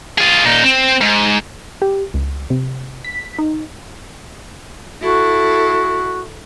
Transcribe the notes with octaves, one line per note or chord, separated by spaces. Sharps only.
F4 G#4
A#2 D#4
C4
G#2
G4
C#2
C3
B6
D#4
E4 F#4 A4